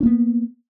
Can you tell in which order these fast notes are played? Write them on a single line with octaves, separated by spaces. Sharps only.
D4 A#3 B3